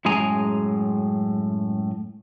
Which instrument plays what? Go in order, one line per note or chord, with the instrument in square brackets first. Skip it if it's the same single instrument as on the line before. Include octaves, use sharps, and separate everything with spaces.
[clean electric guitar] F#2 A2 G#3 G#4 G#5 A#5